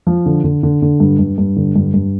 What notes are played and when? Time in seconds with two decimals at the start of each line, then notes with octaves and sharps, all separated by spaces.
0.07 F3
0.26 D3
0.44 D3
0.63 D3
0.82 D3
1.00 G2
1.19 G2
1.38 G2
1.56 D3
1.76 G2
1.94 G2